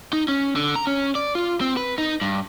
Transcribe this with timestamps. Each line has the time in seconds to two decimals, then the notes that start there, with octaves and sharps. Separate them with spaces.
0.13 D#4
0.28 C#4
0.56 D3
0.76 A#5
0.87 C#4
1.15 D5
1.35 F4
1.61 C4
1.77 B4
1.98 D#4
2.21 G2